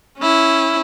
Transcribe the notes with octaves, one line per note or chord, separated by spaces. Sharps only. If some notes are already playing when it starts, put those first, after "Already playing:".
C#4 E4